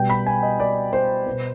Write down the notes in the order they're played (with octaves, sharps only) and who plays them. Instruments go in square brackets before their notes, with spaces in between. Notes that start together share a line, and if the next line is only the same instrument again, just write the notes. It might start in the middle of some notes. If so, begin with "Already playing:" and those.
Already playing: [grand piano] B2 G3 B3 G5
B5
G#5
D#5
D5
C5
B2 B3